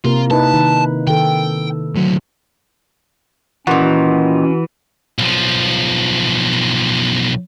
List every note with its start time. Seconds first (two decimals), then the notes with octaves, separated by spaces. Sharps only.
0.05 C3 A#3 F4 A#4
0.31 D#4 E4 B4 A5
0.53 D#3
1.07 D#3 A4 G5
1.95 D2 F#3
3.67 A#2 D#3 E3 C#4 F#4
5.18 B1 F3